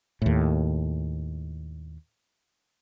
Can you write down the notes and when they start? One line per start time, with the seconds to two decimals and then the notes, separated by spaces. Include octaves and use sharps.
0.22 D#2 A2